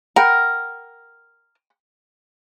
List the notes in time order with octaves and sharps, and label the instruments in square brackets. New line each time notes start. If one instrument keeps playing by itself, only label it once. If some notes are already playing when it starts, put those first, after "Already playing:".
[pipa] A#4 [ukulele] F#5 G5 B5